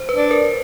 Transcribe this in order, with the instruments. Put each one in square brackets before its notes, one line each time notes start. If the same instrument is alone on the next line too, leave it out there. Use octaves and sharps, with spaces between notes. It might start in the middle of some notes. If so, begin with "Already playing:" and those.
Already playing: [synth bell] C5
B4
[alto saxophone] D4
[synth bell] A#4